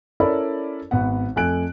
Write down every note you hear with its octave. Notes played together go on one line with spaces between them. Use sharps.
C#4 E4 A4 A#4 D5 B5
G#1 B3 F#5
F2 A3 G#5 F#6 D7